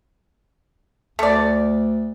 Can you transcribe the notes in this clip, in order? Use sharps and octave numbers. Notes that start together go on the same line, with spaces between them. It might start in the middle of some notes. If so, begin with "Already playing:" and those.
D2 A3 D5